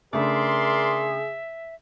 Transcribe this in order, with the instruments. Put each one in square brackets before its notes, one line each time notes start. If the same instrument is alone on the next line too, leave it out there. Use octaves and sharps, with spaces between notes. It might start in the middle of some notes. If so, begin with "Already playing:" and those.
[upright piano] C#3 A3 D4 [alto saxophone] G#4 [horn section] A#4 D5 C6 [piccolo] E5